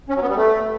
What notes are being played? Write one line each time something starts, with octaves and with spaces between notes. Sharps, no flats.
C#4
F#3
B3
G3
A3